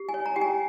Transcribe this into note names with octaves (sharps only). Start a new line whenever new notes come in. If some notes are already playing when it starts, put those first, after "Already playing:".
Already playing: G4
G#5
C#5
A#5
G4 G5
G#5